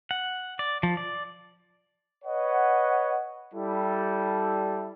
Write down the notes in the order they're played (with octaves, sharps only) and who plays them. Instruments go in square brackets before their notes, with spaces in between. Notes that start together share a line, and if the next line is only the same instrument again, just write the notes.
[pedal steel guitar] F#5
D5
F3
D5
[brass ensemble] B4 C#5 D#5 F#5
G3 E4 A4